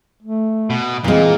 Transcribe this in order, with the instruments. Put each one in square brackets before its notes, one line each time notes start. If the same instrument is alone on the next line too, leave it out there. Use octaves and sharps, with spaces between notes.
[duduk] A3
[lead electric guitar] B2
[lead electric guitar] A#2 A#3 [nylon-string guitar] E3 G#3 [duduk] C4